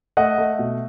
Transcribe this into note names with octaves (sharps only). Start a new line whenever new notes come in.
A3 D#5 F#5
A3
B2